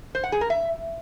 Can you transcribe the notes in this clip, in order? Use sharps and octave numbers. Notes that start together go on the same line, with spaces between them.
C5
F#5
G#4
A#4
E5